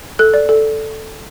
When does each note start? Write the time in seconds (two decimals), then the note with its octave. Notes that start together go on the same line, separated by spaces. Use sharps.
0.19 A4 F#6
0.34 D5
0.49 A4